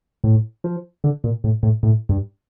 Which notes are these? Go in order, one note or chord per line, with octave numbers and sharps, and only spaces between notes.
A2
F3
D3
A#2
A2
A2
A2
G2